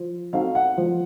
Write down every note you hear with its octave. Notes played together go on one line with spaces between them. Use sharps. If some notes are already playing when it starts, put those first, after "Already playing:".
Already playing: F3
C4 D#4 F#4 A4 F5
F#5
F3